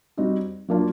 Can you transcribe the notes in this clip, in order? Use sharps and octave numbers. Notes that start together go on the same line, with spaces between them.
G3 C4 D#4 F#4
F#3 A#3 D4 F4